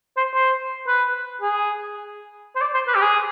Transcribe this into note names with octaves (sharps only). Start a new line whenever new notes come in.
C5
C5
B4
G#4
C5
D5
C5
B4
G4
G#4